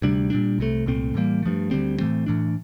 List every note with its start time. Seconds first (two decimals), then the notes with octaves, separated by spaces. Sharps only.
0.02 D2 C3 G3 D4
0.30 A#2 G3 D4
0.59 C2 C3 E3 A3
0.86 C2 A#2 A3 C4
1.14 A2 E3 G3 A#3
1.43 G2 F3 A3
1.71 D2 D3 G3 C4
1.99 A2 E3 A3 C4
2.26 A2 E3 A3 D4